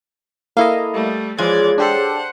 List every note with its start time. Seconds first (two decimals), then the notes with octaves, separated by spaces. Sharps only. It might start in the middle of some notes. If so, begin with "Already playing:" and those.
0.57 A#3 E4 A4 D#5 F5
0.94 G3 A3
1.38 E3 F3 G#3 F4 G#4 C#5 D5 G#6
1.78 D4 G4 A4 C5 F#5